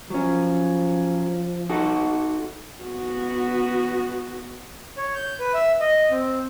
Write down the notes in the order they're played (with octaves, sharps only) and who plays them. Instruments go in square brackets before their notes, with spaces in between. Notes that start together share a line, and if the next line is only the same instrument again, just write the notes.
[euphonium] F3 [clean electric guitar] F#3 C#4
[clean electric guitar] D#4 F#4 A4
[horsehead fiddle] B3 F#4
[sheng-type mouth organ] C#5
G6
B4
E5
D#5
C4